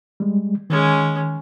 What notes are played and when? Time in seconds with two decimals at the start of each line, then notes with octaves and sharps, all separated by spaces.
0.20 G3 G#3
0.70 D#3 G#3 C#4